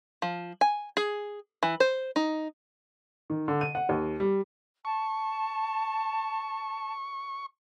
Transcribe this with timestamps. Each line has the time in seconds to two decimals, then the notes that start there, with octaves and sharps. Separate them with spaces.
0.22 F3
0.61 G#5
0.97 G#4
1.63 E3
1.80 C5
2.16 D#4
3.30 D#3
3.48 D3
3.61 D#7
3.75 F#5
3.89 D#2
4.20 G3
4.85 A5 C#6